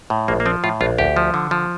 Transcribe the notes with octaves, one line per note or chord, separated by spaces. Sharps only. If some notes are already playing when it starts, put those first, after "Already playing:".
A2
A#1 A#3
A#3
F3 C4
A2 F4
A#1 F4
D2 G4
F3
D3
F3